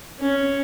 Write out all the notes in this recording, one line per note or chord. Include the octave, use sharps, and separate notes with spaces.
C#4